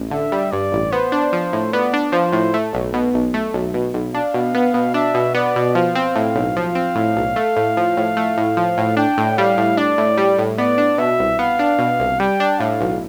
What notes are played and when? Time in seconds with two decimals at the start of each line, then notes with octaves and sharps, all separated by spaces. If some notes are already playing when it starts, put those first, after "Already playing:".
Already playing: A1
0.11 D3 E5
0.32 G3
0.51 G2 D5
0.72 A1
0.92 B3 C5
1.12 D4
1.33 F3
1.53 A2
1.73 B3 D5
1.93 D4
2.12 F3 C5
2.33 A2
2.54 A3
2.73 B1
2.94 B2
3.14 B1
3.34 A3
3.54 B1
3.74 B2
3.94 B1
4.14 D4 F5
4.34 B2
4.54 B3
4.74 B2
4.94 D4 E5
5.14 B2
5.35 B3 D5
5.56 B2
5.75 F3 F5
5.95 C4
6.16 A2
6.35 B1
6.56 F3
6.75 C4
6.95 A2
7.17 B1
7.36 A3
7.57 A2
7.77 F3
7.97 A2
8.17 A3
8.37 A2
8.57 F3
8.78 A2
8.97 D4 G5
9.18 A2
9.38 G3 F5
9.58 A2
9.77 D4 D5
9.98 A2
10.18 G3
10.38 A2
10.58 B3 D5
10.78 D4
10.98 B2 E5
11.19 C2
11.39 B3 F5
11.59 D4
11.79 B2
12.00 C2
12.20 G3 G5
12.40 D4
12.59 A2 F5
12.80 B1